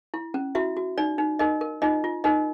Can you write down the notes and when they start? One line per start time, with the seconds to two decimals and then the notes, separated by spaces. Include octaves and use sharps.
0.14 E4
0.34 C#4
0.55 E4 F#4 E5
0.77 F#4
0.98 D#4 D5
1.18 D#4
1.39 D#4 A#4 D#5
1.61 A#4
1.82 D#4 F4 D#5
2.04 F4
2.24 D#4 A#4 D#5